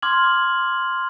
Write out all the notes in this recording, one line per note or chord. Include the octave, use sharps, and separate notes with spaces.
C6 D6 F6 G#6 F#7